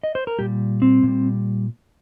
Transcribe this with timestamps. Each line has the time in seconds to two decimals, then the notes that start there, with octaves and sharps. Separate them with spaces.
0.03 D#5
0.15 C5
0.27 A#4
0.38 A#2 G3 G4
0.82 C4
1.03 A#2 G3